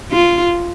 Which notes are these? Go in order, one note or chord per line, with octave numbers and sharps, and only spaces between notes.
F4